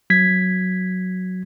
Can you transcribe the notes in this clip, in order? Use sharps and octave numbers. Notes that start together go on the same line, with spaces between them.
F#3 G#6 B6